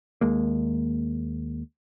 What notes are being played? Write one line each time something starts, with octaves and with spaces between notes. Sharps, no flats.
D#2 G#3 A#3